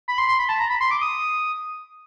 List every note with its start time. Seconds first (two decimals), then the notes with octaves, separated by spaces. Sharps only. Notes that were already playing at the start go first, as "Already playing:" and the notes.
0.08 B5
0.18 C6
0.28 C6
0.39 B5
0.49 A5
0.60 A#5
0.70 B5
0.80 C6
0.91 D6
1.01 D#6